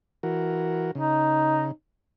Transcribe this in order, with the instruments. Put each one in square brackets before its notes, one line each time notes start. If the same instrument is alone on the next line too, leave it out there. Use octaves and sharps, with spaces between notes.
[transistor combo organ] E3 F#4 A#4
[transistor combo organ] C#3 [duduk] D#4